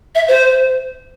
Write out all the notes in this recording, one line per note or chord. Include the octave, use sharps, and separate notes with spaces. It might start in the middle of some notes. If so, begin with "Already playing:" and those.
E5
C5